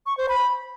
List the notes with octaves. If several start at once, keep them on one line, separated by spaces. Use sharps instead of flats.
C#6
C5
B5